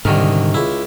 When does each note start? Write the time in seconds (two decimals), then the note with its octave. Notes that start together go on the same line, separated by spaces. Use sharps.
0.05 C2 G#2 D3 D#3 A#4
0.54 C#2 E4